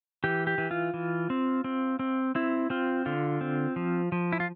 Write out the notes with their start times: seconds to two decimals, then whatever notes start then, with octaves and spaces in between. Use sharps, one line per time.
0.24 E3 G4
0.47 G4
0.58 E3
0.71 F4
0.94 E3
1.30 C4
1.64 C4
1.99 C4
2.35 C4 E4
2.70 C4 F4
3.06 D3 F4
3.41 C4
3.76 F3
4.12 F3
4.32 E4
4.40 F4